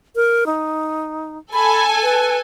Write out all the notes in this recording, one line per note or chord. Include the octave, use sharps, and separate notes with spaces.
A#4
D#4
A4 G#5 B5
B4